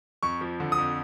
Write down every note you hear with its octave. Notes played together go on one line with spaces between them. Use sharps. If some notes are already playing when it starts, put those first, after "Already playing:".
F2 C#6
F3
D3
D#6
F2